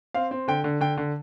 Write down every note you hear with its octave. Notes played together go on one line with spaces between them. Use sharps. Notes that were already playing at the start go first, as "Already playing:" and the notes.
C4 F5
C4
D3 G5
D3
D3 G5
D3